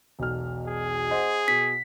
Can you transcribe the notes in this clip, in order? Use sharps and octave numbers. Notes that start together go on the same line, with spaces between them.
E1 B1 F6
G#4
C5 D#5 F#5
B2 B6